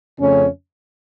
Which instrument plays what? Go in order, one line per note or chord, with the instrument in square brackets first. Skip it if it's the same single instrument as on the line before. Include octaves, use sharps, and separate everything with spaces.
[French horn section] F2 C#3 A3 C#4